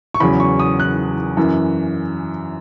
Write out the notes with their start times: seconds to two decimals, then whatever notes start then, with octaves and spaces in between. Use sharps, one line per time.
0.14 C#6
0.20 E2 C#3 F#3 B5
0.40 C#6
0.60 D#6
0.80 F#6
1.37 F#2 E3